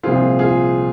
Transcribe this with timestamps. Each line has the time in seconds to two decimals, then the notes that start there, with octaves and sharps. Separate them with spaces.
0.03 C2 A#2 F3 C4 F4 G#4
0.39 F4 G#4